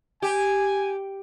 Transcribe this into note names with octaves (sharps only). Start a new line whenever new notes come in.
G4 G#5